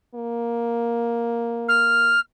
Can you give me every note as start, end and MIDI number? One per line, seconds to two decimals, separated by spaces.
0.15 2.16 58
1.68 2.20 89